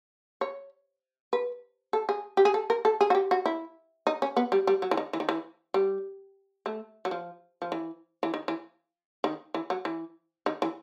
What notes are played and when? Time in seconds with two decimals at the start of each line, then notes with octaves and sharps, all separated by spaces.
0.41 C#5
1.33 B4
1.93 A4
2.09 G#4
2.37 G4
2.45 G#4
2.54 A4
2.70 A#4
2.85 A4
3.01 G#4
3.10 F#4
3.15 G4
3.31 F#4
3.46 E4
4.07 D#4
4.22 C#4
4.37 B3
4.52 G3
4.67 G3
4.82 F#3
4.91 E3
4.97 D#3
5.13 E3
5.20 D#3
5.29 E3
5.74 G3
6.66 A3
7.05 F#3
7.11 F3
7.62 F3
7.72 E3
8.23 E3
8.34 D#3
8.48 E3
9.24 D#3
9.54 E3
9.70 F#3
9.85 E3
10.46 D#3
10.62 E3